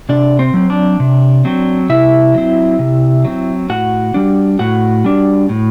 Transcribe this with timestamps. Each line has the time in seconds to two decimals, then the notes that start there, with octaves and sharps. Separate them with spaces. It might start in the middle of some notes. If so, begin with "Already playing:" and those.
0.09 C3 D4 D5
0.39 C4 C5
0.54 F#3 C4
0.70 D4 D5
1.00 C3
1.45 F#3 C4
1.89 C3 E4 E5
2.34 F#3 C4
2.79 C3
3.25 F#3 C4
3.69 A2 F#4 F#5
4.14 G3 D4
4.59 A2 F#4 F#5
5.04 G3 D4
5.49 A2